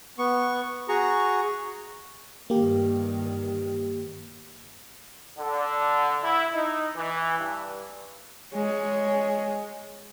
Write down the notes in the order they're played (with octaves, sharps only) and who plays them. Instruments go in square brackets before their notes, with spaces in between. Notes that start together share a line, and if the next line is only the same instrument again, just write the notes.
[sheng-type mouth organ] B3 C#6
F#4 G#4 A#5 C#6
[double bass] G2 D#3 [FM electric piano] A#3 G4
[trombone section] D3
E4
D#4
E3
G2
[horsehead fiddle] G#3 C#5